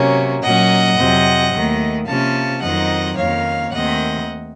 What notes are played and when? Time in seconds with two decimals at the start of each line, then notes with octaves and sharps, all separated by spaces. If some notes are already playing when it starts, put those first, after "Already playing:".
Already playing: C3 F#3 A#3 C#4
0.43 A#2 F#3 A#3 C#4 D#5 F#5
0.98 F2 C3 F#3 C4
1.53 D#2 D#3 A3
2.08 C3 F3 A#3 C#4 F5 A5
2.63 F2 D#3 F#3 C4 D#4 D#5 F#5
3.18 F2 D#3 A#3 C#4 C#5 F5
3.73 D#2 D#3 A3 C4 D#5 F#5